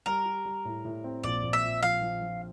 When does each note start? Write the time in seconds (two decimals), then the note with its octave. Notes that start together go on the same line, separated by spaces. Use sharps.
0.06 G3 A#4
0.25 G4
0.45 G3
0.65 A2
0.85 A2
1.04 C4
1.24 A#1 D5
1.43 A#1
1.53 E5
1.63 F3
1.82 F3 F5
2.01 F3
2.21 F3